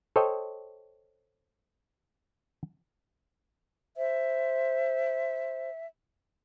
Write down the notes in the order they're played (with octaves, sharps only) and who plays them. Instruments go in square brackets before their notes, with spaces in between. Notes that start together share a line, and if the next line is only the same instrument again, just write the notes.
[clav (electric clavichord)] A4 C5 C#5 D#5 G5
[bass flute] C5 [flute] E5